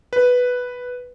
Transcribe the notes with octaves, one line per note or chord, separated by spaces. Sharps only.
B4